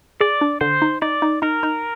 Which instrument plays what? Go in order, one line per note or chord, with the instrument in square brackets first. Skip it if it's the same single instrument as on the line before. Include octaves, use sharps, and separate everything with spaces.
[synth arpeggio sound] G#4 [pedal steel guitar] D5
[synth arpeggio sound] D4
[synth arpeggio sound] D3 [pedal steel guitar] C5
[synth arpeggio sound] D#4
[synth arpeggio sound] D#4 [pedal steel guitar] D5
[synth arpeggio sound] D#4
[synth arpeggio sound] D#4 [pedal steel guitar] A#4
[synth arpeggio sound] D#4